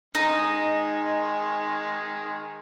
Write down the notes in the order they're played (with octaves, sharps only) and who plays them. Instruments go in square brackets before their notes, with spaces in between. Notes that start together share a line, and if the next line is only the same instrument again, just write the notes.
[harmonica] D#3 G#3 [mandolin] D#4